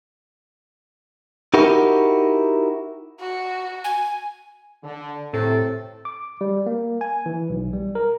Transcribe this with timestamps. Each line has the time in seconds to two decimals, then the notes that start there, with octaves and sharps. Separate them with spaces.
1.54 D#4 E4 F#4 G4 A#4
3.20 F#4
3.84 G#5
4.83 D3
5.33 A2 C3 C4 A4
6.05 D6
6.41 G3
6.66 A#3
7.01 G#5
7.26 E3
7.50 B1
7.73 G3
7.95 A#4